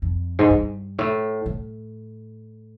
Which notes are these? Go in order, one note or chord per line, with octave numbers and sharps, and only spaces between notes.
F2
G#2
G2
A2
A2